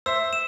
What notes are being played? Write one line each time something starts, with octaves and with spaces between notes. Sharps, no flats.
C5 E5 E6
E7